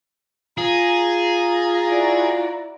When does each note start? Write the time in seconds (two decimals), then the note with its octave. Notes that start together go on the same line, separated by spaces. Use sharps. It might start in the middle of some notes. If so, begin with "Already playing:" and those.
0.58 F4 G#4 A#5
1.85 E4 F#4 D5